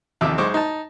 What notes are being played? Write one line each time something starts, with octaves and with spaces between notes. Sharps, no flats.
A1 D#2 C3 F3 E5 D6
B1 G#3 C5 C#6 D6
D#4 A5